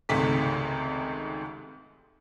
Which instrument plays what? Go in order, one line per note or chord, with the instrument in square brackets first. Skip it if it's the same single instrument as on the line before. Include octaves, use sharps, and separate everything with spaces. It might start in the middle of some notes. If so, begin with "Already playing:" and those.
[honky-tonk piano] G#1 C#2 G#2 C3 A3 B6